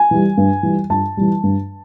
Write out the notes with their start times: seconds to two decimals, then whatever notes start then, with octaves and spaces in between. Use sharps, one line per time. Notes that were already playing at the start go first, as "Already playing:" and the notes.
Already playing: G#5
0.11 E3 G3
0.37 G2
0.63 E3 G3
0.90 G2 A5
1.17 E3 G3
1.43 G2